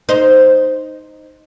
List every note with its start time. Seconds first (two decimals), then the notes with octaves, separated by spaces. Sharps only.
0.09 D#4 C5